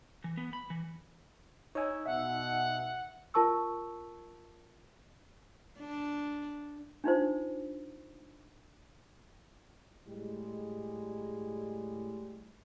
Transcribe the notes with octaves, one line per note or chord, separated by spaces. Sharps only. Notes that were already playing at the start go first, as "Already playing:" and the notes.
E3
B3
B5
E3
D#4 C#5 G#5 E6
B2 E5 F#5
F4 A#4 A5 C#6 E6
D4
D4 D#4 F4 C5
A2 G3 G#3